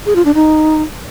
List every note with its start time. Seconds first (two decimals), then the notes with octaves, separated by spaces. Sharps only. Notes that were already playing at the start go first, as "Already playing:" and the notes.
0.06 G#4
0.16 F4
0.25 D4
0.35 D#4